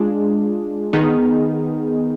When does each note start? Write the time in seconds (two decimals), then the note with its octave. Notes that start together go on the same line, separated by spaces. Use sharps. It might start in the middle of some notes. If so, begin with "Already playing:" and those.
Already playing: G#3 D4 F4 G#4
0.93 D#3 B3 D#4 G#4